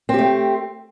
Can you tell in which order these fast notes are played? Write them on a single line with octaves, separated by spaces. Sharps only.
C4 G4 A3